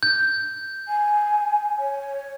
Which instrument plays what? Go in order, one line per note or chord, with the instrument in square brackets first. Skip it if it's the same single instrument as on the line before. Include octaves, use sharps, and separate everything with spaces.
[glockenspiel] G6
[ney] G#5
C#5